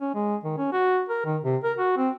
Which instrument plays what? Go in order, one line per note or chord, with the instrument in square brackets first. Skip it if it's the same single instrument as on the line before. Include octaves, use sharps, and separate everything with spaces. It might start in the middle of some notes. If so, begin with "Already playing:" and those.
[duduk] C#4
G#3
D#3
C#4
F#4
A#4
D#3
C3
A#4
F#4
C4